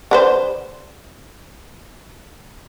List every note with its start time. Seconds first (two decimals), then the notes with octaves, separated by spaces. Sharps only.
0.11 D3 B4 C5